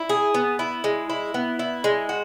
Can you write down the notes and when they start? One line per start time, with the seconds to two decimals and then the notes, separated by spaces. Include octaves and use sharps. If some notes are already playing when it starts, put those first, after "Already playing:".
Already playing: E4
0.09 G#4
0.34 B3
0.59 E4
0.84 G#3
1.10 E4
1.34 B3
1.59 E4
1.84 G#3
2.09 F#4